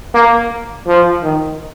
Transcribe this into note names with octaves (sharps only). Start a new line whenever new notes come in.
A#3
F3
D#3